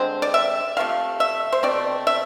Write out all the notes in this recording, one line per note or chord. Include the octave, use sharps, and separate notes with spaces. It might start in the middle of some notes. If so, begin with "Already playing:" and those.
Already playing: D3 G#3 C4 C5
D5
E5
C3 F3 A3 F5
E5
C5
B2 A3 C4 D5
E5